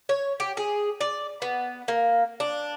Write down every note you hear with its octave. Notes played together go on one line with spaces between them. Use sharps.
C#5
G4
G#4
D5
B3
A#3
D4